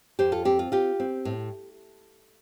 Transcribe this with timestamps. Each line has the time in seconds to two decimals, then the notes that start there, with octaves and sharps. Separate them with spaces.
0.19 F2 G4 C5
0.32 F4 A4
0.45 C4 G4
0.59 F4
0.72 F4 G4
1.00 C4
1.25 A2